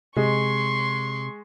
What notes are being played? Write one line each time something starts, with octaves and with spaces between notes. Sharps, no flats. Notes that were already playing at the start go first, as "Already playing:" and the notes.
C3 G#3 C6 C#6